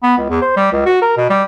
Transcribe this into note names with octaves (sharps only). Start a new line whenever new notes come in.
B3
C#2
E2
C5
G3
C#2
F#4
A#4
B2
G3